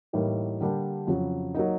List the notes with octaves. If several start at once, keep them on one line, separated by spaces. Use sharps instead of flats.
A2 E3 G3 A#3 D#4
D3 G3 A#3 D4 G4
F2 C#3 F#3
F#3 A#3 D#4